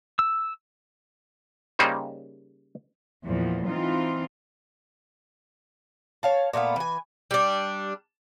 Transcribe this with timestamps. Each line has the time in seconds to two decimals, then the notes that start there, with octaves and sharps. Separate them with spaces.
0.19 E6
1.79 C#3 G3 A#3 D#4 C5
3.24 E2 A#2 F3
3.67 E3 C4 D#4 F4
6.23 C#5 F5 A5
6.53 A#2 A3 B3 F5
6.76 E3 G#5
7.31 G3 D4